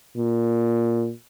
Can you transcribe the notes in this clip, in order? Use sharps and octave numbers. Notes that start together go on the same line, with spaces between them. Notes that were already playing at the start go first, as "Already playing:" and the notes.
A#2